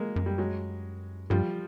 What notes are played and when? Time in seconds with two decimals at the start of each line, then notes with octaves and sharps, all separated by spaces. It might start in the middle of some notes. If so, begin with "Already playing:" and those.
Already playing: G#3 A#3
0.16 F#2
0.26 G3
0.38 F#3 G#3
1.30 G2 F3 G3